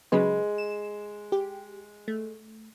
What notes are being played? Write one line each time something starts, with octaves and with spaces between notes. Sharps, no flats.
C#3 F#3 G#3 B4
E7
G4
A3